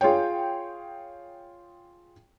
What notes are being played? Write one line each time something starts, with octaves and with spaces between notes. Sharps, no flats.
F4 G#4 C#5 G5